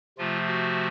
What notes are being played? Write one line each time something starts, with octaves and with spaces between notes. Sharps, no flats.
C3 F3 A3 F4
F#4